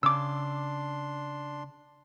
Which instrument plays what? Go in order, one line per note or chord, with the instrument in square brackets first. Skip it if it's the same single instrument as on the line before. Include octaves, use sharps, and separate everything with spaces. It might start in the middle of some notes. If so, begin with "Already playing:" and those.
[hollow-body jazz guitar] C#3 [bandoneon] D4 C6 [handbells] D6 E6